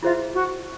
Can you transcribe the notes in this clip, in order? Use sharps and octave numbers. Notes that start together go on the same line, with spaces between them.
E4 F4 G#4 C5 E5
F#4